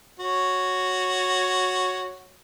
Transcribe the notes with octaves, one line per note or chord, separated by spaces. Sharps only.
F#4 C#5